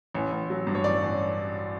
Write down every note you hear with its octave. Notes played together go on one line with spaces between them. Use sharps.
A1
A1
F#3
G2
C#5
A1 D5
A1